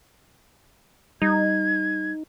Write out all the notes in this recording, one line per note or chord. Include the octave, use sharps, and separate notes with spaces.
G3 D#4 G#6